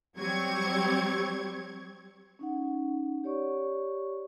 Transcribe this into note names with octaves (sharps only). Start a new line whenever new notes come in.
F#3 G3 C4 C#6 G#6
C#4 D#4 F#5
G4 C#5 D5 C#6